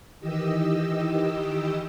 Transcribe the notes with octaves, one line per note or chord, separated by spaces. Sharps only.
D#3 E3 G4 D#5 E6